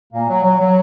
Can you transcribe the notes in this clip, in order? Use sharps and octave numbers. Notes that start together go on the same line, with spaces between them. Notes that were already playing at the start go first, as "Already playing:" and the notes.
A#2 A#3
F#3
F#3
F#3